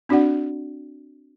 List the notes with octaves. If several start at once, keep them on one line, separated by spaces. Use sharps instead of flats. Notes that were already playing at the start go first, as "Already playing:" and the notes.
C4 D4 F#4 D5 F#5